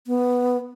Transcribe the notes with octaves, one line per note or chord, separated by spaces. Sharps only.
B3